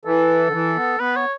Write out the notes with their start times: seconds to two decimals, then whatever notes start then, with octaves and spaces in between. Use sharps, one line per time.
0.05 E3 A4
0.48 D3
0.52 E3
0.76 B3
1.00 B3 B4
1.16 C#5